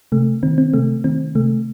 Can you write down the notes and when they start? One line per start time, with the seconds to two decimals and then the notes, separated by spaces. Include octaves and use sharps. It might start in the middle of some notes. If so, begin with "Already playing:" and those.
0.12 C3 A3
0.43 D#3 C4
0.58 C4
0.74 C3 A3
1.04 D#3 C4
1.35 C3 A3